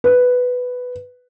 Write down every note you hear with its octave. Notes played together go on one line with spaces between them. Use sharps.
B4